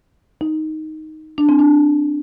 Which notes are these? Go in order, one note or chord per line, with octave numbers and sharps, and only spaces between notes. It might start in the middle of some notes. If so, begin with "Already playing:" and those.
D#4
D4
C4
D4